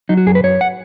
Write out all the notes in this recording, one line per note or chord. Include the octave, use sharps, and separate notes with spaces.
F#3 D#4
F#4
F#2 G#4
B4
F#2 C#5
F#5